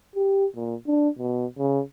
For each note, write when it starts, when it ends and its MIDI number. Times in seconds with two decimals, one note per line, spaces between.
0.15 0.45 67
0.56 0.75 46
0.87 1.08 62
1.19 1.46 47
1.58 1.80 49